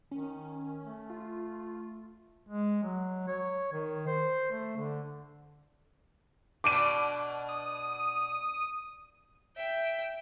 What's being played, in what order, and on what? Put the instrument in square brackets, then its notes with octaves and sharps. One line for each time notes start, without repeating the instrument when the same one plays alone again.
[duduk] D#3 [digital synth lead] C#4
[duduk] A3
[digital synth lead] F4
[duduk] G#3
F#3
C#5
D#3
C5
A3
D3
[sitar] B2 D4 [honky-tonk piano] D6 D7 D#7
[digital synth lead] D#6
[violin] E5 G5